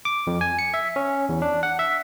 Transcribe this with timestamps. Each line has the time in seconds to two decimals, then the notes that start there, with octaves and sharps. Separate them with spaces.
0.05 D6
0.27 F2
0.41 G#5
0.59 C#7
0.74 E5
0.96 C#4
1.29 E2
1.42 D4
1.63 F#5
1.79 E5